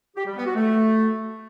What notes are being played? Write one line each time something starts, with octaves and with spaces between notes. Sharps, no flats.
G4
G3
B3
F#4
A3